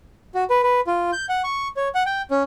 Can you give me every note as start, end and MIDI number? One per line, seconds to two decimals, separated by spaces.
0.35 0.44 66
0.50 0.63 71
0.63 0.81 71
0.87 1.11 65
1.12 1.26 91
1.29 1.42 78
1.44 1.68 85
1.77 1.88 73
1.95 2.03 78
2.06 2.22 79
2.31 2.43 61